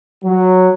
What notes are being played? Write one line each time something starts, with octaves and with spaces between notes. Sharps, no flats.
F#3